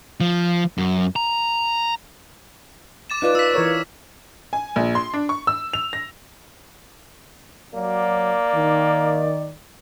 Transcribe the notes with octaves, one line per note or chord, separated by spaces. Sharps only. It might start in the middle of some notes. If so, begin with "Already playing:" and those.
F3
F#2
A#5
D6 A6 E7
D#4 F4 B4 D5
F4 E6 B6
E3 A#4 C#5
G#5
A#1
C6
D4
C#6
E6
F7
A#6
F#3 A#3 D5
D#3